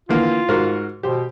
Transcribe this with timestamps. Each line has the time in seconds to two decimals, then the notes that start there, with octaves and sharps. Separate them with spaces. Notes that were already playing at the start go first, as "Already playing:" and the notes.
0.09 D3 E3 A#3 F4
0.48 G#2 F#4 A#4
1.03 B2 G4 C5